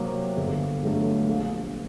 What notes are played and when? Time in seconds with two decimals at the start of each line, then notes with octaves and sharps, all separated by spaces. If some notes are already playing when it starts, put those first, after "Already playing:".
Already playing: C3 F#3 A#3
0.37 G1
0.83 G2 F#3 A3
1.28 A#1